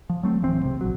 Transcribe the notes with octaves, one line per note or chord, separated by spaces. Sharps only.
F3
F#3 A3 C4
D1 E3 C4
C#2 C3
A#1 F#3